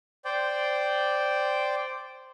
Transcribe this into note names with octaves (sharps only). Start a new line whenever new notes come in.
C5 D5 G5